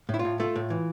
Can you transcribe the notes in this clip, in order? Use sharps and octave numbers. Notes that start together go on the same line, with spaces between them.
A2 E4
F4
A2
A3 F4
A2
E3